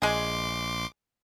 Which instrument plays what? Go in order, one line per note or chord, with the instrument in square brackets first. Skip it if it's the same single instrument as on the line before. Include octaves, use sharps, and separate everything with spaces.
[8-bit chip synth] A#1 C6 D6 [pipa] G#3 G#4